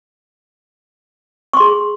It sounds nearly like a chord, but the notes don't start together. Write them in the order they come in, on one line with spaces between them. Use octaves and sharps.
C#6 C6 G#4